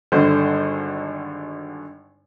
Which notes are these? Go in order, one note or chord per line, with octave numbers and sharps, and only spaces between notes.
G#1 G2 D3 C5